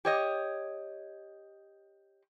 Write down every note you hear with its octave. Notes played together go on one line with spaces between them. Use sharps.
G4 C#5 D#5